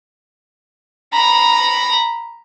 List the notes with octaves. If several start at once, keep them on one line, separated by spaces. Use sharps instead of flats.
A#5 B5